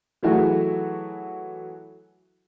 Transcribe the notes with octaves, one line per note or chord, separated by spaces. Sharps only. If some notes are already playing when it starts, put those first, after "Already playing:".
E3 F#3 A3 E4 F#4 G#4